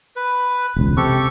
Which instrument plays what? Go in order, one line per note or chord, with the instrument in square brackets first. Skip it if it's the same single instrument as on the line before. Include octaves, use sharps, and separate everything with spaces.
[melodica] B4
[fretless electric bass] E1 C#2
[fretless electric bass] C3 [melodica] G4 A4 C#6